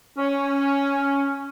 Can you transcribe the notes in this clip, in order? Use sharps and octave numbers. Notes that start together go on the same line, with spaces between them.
C#4